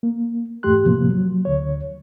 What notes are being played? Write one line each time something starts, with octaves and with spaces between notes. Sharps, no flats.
A#3
E2 G#2 A3 G4 C6 F#6
A2 C3 F3 A#3
F#3
D2 D3 C#5